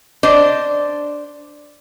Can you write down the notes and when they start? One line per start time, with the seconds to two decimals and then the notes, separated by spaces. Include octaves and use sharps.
0.23 D4 C5 D5 D#5